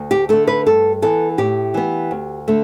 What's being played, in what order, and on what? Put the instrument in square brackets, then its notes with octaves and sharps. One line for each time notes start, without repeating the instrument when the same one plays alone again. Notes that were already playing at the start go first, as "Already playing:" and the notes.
Already playing: [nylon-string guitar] D2
G4
D3 A3 A4
B4
G2 A4
E3 B3 A4
A2 G4
E3 B3
D2
D3 A3